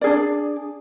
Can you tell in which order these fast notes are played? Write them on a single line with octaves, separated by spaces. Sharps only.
D5 G#4 D4